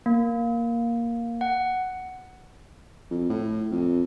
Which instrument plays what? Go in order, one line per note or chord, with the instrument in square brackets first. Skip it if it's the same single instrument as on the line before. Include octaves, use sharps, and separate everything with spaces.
[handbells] A#3
F#5
[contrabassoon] F2
A2
F2